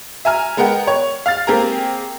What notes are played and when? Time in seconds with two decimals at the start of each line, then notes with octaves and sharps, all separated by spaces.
0.25 E5 G#5 A#5 F6
0.57 G#3 B3 A#4 F#5 G5
0.87 C#5
1.26 F5 F6 A6
1.47 A#3 C4 G4 G#4 A#4 A#5